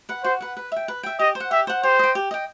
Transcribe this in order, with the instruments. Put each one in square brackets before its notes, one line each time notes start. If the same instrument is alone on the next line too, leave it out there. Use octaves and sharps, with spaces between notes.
[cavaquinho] B4 F#5
[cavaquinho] F#4 [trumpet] C5
[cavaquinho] B4 F#5
B4
E5 G5
B4
E5 G5
[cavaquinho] G4 [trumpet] D#5
[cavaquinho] C5
F#5
[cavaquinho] G4 [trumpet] E5
[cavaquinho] C5 F#5
[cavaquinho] G4 [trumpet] C5
[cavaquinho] D#5 G5
G4
D#5 G5